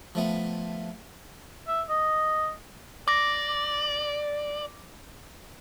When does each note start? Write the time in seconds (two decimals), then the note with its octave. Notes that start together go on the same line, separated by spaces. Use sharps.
0.15 F3 A3 B3
1.68 E5
1.89 D#5
3.08 D5 D6 A#6